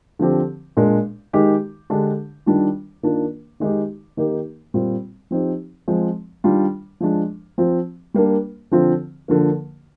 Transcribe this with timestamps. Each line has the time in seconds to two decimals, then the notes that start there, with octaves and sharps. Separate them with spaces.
0.19 D3 F3 C4 G4
0.77 A#2 G#3 D4
1.33 D#3 G#3 D#4 G4
1.90 D3 G#3 D4 G4
2.46 D#3 G3 D4 F4
3.03 D#3 A#3 D4 F4
3.60 D#3 G#3 D#4 G4
4.17 D#3 A#3 D#4 G4
4.74 A#2 G3 C4 F4
5.31 F3 C4 D#4 G4
5.88 F3 G#3 C4
6.44 D#3 G3 D4 F4
7.00 F3 G#3 D4
7.58 F3 C4 F4
8.14 G3 A#3 D4
8.71 D3 F3 C4 F4
9.28 D3 F3 A#3